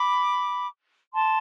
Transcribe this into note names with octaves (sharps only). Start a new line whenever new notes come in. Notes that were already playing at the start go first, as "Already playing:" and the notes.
Already playing: B5 D6
A5 C6